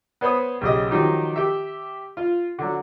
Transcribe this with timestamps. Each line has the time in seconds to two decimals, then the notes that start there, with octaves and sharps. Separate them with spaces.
0.21 B3 C5 C#5 B5 D#6
0.61 B1 C#3 G4 D#5
0.91 D#3 F3 F#3 D#4 G4
1.36 G4 E5
2.17 F4
2.59 D3 F#3